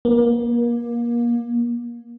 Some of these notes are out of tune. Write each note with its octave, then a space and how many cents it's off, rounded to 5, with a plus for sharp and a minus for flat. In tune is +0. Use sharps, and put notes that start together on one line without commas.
A#3 +30